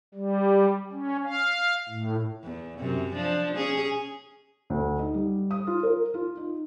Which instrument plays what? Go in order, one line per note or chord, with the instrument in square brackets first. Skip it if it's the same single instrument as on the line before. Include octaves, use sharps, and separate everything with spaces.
[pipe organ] G3
C#4
F5
A2
[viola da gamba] E2
F#2 C3
F3 D4
C#4 G#4
[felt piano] D2
D#4
G3
D#6
F4
A#4
F4
D#4